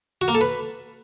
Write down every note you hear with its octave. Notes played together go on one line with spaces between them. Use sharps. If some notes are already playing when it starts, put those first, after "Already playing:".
F#4
A#3
A4
B4